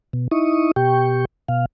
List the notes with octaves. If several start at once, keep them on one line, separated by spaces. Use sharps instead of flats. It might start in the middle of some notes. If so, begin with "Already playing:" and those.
B2
D#4 E4 C#6 D#6
B2 G4 G5 C#6
B2 F5